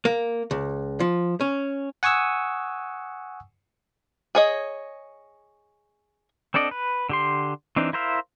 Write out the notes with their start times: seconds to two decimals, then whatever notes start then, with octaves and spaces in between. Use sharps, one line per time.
0.05 A#3
0.51 C#2
1.00 F3
1.41 C#4
2.03 F#5 G#5 C#6 D#6 E6
4.35 G#4 C#5 D#5
6.54 C4 D4 A4 D5 D#5
6.71 B4
7.09 D3 G4 C6
7.76 E3 C4 D4 D#4
7.93 E4 A#4 C5 E5 F5